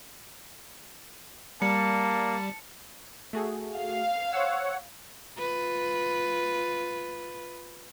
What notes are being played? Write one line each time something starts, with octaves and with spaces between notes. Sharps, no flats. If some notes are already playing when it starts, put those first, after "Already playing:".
G3 A#3 A5 C#7
A3 F#4 G#4
F5
C5 C#5 F#5 E6
F4 B4